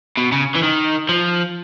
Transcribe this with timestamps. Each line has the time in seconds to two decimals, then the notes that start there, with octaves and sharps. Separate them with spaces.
0.17 B2
0.32 C#3
0.55 E3
0.64 D#3
1.09 F3